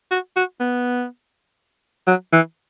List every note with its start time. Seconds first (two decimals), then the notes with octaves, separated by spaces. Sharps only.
0.11 F#4
0.36 F#4
0.60 B3
2.07 F#3
2.32 E3